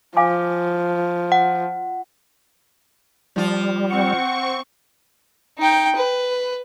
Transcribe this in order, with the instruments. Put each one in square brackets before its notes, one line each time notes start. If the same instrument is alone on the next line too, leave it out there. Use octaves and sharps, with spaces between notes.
[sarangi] F3 [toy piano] F5 G#5 D6
[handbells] F#5
[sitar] F3 F4 [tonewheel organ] G3
[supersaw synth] C4 C#6 [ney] F#5
[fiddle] D#4 G5
B4